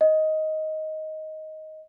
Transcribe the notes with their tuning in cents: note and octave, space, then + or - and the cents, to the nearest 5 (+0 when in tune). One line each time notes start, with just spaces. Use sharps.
D#5 +10